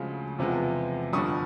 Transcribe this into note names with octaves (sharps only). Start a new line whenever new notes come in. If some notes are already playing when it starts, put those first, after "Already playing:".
Already playing: D2 C#3 F3 G#3
E2 C3 F3 G#3 B3
G1 F2 D3 G3 C#6 D#6